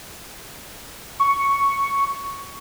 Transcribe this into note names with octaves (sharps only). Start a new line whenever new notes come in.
C#6